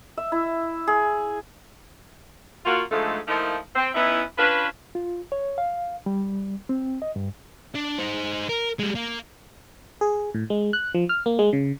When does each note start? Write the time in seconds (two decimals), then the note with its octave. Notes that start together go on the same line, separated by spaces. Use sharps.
0.17 E5
0.32 E4
0.87 G#4
2.65 A#3 F4 F#4
2.91 G#2 D3 F3 G#3 A3
3.27 F3 A3 A#3 D#4 E4 A#4
3.75 C4
3.94 B3 C#4 D#4 E4
4.38 C#4 D4 F4 B4
4.95 F4
5.32 C#5
5.58 F5
6.06 G3
6.69 C4
7.02 D#5
7.16 G2
7.75 D4
7.98 D#4 C5
8.49 A#4
8.79 G3 G#3
8.95 A#3
10.01 G#4
10.34 A2
10.50 G#3
10.73 F#6
10.95 F3
11.09 F6
11.26 A#3
11.39 G#3
11.53 C#3